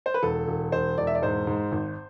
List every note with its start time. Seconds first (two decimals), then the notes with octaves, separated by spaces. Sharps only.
0.06 C5
0.14 B4
0.22 E1 A4
0.47 E1
0.72 E1 C5
0.97 E1 D5
1.07 E5
1.15 D5
1.22 G#2 C5
1.47 G#2
1.72 G#1